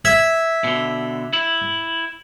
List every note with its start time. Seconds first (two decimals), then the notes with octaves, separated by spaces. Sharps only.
0.05 E5 E6 G#6
0.64 B2 D3
1.33 E4